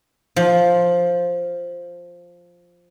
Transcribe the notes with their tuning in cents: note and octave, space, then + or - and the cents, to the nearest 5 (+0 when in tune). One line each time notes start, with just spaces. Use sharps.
F3 +5